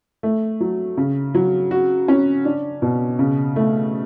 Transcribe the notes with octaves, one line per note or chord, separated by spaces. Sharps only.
A3
F#3
C#3
F#3
F#4
C#4
D4
B2
C#3
A3